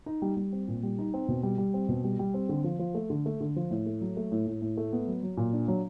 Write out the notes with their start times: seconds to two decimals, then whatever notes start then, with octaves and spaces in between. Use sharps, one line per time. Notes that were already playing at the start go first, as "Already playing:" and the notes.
0.06 D#4
0.22 G3
0.37 G3
0.53 C4
0.68 A#2
0.83 G3
0.99 D#4
1.14 C4
1.28 B2
1.43 G3
1.58 G3
1.74 C4
1.89 B2
2.04 G3
2.19 G3
2.34 C4
2.49 D3
2.64 F3
2.79 F3
2.95 A3
3.10 D3
3.26 A3
3.41 D3
3.56 F3
3.71 A2
3.86 A3
4.01 F#3
4.17 A3
4.32 A2
4.47 A2
4.62 A2
4.77 A3
4.93 B3
5.07 F#3
5.23 F#3
5.37 A#2
5.53 D4
5.68 F#3